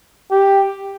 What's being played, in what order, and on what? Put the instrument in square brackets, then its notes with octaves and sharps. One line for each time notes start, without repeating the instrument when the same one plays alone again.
[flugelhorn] G4